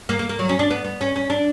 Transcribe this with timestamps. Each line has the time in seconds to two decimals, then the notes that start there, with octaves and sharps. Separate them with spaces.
0.09 A#3
0.19 A#3
0.29 A#3
0.39 F#3
0.49 C#4
0.59 D4
0.70 B3
0.84 B3
1.01 C#4
1.16 C#4
1.30 D4